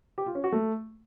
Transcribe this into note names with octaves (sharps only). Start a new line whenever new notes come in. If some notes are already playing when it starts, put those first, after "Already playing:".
G4
F4
C#4
F#4
A3